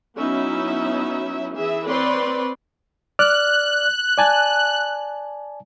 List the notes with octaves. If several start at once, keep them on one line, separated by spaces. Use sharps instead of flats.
F#3 B3 C#4 D#4 E4 E5
E3 G#4 E5
C4 B4 C#5 D5 C6
D5 F6 F#6
D5 G#5 A5